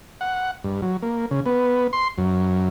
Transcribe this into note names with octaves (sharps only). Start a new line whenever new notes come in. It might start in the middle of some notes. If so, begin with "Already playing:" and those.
F#5
G2
F#3
A#3
C#3
B3
C6
F#2